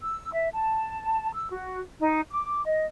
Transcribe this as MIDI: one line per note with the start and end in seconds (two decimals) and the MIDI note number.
0.01 0.31 88
0.32 0.48 76
0.53 1.31 81
1.33 1.49 88
1.51 1.81 66
2.00 2.21 63
2.31 2.61 86
2.65 2.83 75